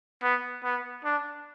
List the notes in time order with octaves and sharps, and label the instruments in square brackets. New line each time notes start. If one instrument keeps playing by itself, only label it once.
[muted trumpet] B3
B3
D4